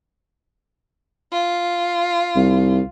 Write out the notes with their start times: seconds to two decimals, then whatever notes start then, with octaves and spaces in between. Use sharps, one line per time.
1.33 F4
2.36 C2